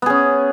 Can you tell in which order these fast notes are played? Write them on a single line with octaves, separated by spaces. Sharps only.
B3 G#4 C#4